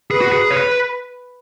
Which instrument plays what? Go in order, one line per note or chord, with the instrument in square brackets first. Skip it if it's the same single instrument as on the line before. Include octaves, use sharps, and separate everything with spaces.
[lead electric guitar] G#4 [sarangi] B4
[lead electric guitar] F#4
G#4
C#5
B4